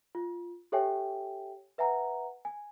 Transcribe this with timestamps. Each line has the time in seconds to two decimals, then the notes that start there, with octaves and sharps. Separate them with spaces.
0.15 F4
0.72 G4 A4 C#5 E5 G5 G#5
1.78 B4 E5 F#5 G#5 A#5
2.45 G#5